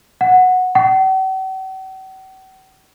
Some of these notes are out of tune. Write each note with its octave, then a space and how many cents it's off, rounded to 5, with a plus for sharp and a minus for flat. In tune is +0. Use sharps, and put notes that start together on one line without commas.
F#5 -10
F#5 +45